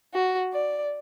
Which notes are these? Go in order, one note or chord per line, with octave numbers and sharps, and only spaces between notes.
F#4
D5